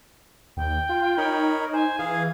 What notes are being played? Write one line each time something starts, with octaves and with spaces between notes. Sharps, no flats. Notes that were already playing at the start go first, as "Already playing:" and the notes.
D#2 G5
F4
D#4 A#4 C#5 B5
C5 G#5
E3 G#4 F5
G#6